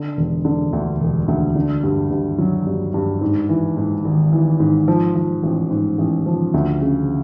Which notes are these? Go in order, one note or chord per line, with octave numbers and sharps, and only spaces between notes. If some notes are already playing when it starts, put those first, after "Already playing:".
Already playing: D3
E1
D3
D2
E1
D2
D3
G2
G2
F#3
G2
G2
G#2
E3
G#2
G#1
E3
G#2
F3
F3
A1
G#2
A1
F3
D2
C#3